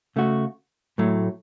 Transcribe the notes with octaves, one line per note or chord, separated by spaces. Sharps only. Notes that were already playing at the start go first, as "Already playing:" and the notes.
C#3 A3 F#4
A2 F#3 A3